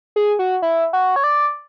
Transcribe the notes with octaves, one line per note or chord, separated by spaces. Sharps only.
G#4
F#4
E4
F#4
C#5
D5